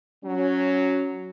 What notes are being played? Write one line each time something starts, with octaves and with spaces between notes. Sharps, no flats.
F#3 C#4